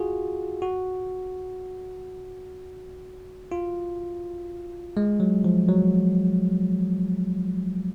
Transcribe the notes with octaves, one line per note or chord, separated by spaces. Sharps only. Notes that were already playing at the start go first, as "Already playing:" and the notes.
Already playing: F4 F#4 G#4
F#4
F4
G#3
F#3
F3
F#3